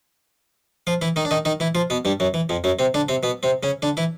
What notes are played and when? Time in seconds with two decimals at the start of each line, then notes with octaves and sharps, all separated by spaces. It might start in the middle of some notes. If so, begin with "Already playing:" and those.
0.87 F3 F4
1.02 E3 E4
1.16 D#3 D#4
1.25 D4
1.31 D#3 D#4
1.45 D#3 D#4
1.60 E3 E4
1.75 F3 F4
1.90 B2 B3
2.05 G2 G3
2.20 F#2 F#3
2.34 E3
2.49 F2 F3
2.64 F#2 F#3
2.79 C3 C4
2.94 D3 D4
3.09 C3 C4
3.23 B2 B3
3.43 C3 C4
3.63 C#3 C#4
3.82 D3 D4
3.97 E3 E4